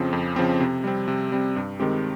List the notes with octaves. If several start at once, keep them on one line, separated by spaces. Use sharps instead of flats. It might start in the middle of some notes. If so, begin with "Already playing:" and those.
Already playing: F2 C#3 F3 C4
F2
C#3 F3 C4
C3
G3 C4
C3
G3 C4
G2
D#3 G#3 C4 G4